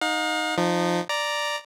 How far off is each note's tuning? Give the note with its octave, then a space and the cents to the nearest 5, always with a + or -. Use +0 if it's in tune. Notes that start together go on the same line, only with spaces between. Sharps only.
D#4 +0 F5 +40
F3 +0 D#4 -25
D5 +0 A#5 +0